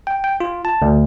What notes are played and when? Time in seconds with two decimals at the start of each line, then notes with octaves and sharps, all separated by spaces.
0.07 G5
0.24 G5
0.40 F4
0.65 A5
0.82 D2